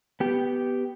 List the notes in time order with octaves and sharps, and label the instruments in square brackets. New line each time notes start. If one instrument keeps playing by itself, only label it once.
[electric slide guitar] B3 G4